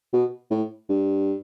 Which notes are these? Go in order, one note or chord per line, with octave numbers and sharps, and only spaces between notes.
B2
A2
G2